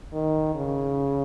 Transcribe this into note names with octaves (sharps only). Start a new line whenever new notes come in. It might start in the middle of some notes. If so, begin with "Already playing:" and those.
D#3
C#3